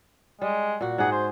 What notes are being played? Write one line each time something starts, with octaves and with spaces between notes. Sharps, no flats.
G3 G#3
A#2 F#4
G#2 G#4 F#5
C5